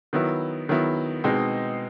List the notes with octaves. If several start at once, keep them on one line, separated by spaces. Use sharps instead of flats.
D#3 F#3 B3 E4
D#3 F#3 B3 E4
B2 G#3 C4 D#4